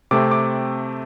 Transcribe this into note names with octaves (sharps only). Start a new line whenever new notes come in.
C3 A3 C4 D6
D6